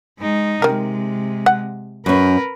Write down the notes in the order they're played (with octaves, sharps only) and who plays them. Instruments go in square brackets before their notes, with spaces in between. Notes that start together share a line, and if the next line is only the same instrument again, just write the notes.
[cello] G#3 D#4
[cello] C3 G#3 [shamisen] D#3 A#4
[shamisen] F#5
[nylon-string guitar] F#2 C#4 [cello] A#4 B4